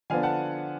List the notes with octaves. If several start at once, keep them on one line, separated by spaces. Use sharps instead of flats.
D3 F3 B3 D4 F5 G#5
F#5 A5